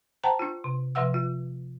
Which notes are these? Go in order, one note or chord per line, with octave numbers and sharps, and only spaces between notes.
C5 F#5 G5 A5 A#5
D4 F4
C3
C3 F3 B4 E5 F#5 E6
F4